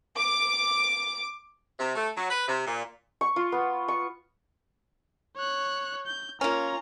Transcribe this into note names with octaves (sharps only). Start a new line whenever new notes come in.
D6
C3
A3
F#3
B4
C3
A#2
C#6
F4
B3
C#6
C#5 F#6
G6
A#3 C#4 F4 A#5